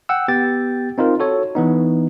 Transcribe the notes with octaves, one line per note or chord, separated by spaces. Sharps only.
F#5 G5 E6
B3 G4 G5 A6
C4 D#4 F4 A#4
F#4 A4 C#5
E3 B3 D#4